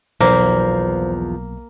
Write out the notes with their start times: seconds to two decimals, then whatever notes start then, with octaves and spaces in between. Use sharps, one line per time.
0.20 B1 E2 F3 A#3 C5